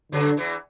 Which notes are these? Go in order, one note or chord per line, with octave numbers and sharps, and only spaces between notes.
F#2 D3 F#3
E2 E3